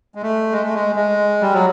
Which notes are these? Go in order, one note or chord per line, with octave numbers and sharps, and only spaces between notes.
G#3
A3
G#3
A3
G#3
G#3
G3
F#3